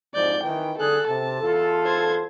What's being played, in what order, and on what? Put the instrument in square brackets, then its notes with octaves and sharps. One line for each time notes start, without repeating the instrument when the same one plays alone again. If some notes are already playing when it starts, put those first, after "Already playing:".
[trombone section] F2 G#2 [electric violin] D5 G6
[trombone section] D#3 E3 [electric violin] G5
[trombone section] D3 G#4 [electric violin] A4 F#6
[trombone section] C3 [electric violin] A5
[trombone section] E2 F4 A4
[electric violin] C5 G#6